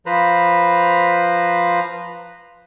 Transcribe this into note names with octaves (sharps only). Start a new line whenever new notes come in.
F3 B4 C5 A#5 B5